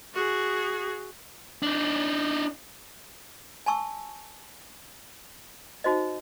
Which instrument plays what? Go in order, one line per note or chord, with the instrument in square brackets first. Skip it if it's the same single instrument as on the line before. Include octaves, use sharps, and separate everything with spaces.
[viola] F#4 G#4
[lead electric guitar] D4 D#4
[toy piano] G#5 A5 C#6 E6
D#4 F#4 C5 D#5